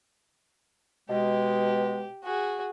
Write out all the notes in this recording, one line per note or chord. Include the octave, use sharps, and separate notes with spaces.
B2 G#3 G4
F#4 G#4